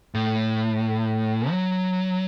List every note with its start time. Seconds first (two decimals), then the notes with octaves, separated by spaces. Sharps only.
0.15 A2
1.50 F#3